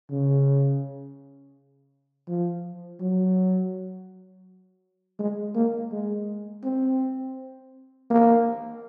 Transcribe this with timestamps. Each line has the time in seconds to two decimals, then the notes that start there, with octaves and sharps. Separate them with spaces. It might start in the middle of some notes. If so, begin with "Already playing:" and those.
0.11 C#3
2.28 F3
3.01 F#3
5.19 G#3
5.55 A#3
5.92 G#3
6.64 C4
8.10 A#3